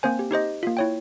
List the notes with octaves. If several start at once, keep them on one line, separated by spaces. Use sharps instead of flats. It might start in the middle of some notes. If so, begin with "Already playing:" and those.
A#3 C4 C5 G#5
G4
D#4 G4 C5 D#5
A#3 F4
E4 C#5 G5